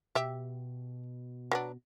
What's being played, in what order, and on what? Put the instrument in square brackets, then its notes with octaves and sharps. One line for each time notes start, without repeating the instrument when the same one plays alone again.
[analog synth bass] B2 [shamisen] G4 E5
[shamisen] F#3 B3 D4